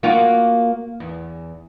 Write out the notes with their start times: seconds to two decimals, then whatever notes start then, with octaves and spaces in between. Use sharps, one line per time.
0.03 A#3 F4 F#4
1.00 E2